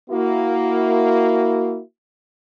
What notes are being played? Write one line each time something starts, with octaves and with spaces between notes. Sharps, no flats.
A#3 E4 F#4